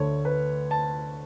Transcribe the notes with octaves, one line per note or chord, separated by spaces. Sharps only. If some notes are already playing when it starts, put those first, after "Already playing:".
Already playing: D2 D3 A3 C#5
B4
A5